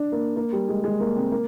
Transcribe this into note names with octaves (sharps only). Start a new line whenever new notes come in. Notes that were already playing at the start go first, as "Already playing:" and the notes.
Already playing: D4
A#3
A#3
G3
G#3
G#3
A#3
C4
A#3